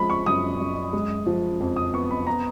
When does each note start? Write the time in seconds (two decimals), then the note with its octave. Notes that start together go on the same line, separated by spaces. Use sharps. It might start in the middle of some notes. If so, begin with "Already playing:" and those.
Already playing: F3 G#3 B5
0.10 C#6
0.26 F#2 D#6
0.60 F#2
0.93 G#3
1.26 F3
1.60 F2
1.76 D#6
1.93 B3 C#6
2.11 B5
2.27 B3 A#5